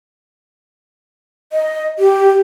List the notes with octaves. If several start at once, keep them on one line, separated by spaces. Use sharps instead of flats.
D#5
G4